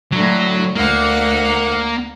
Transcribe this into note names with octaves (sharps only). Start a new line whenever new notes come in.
A2 D3 F#3
D2 A#3 F#5